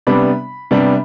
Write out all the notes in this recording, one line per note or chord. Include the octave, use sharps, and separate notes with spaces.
C3 G3 B3 D4 B5
C3 G3 B3 D4